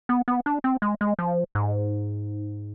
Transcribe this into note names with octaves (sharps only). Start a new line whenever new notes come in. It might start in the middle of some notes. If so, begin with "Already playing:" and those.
B3
B3
D4
C4
G#3
G#3
F3
G#2